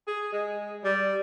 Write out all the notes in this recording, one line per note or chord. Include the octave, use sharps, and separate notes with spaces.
G#4
G#3
G3